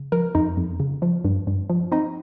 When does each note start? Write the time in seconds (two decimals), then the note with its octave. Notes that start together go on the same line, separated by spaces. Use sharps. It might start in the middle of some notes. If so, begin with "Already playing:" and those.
Already playing: C#3
0.12 F3 A#4
0.35 F2 D#4
0.57 F2
0.80 C#3
1.02 F3
1.25 G2
1.47 G2
1.70 F3
1.92 C4 D#4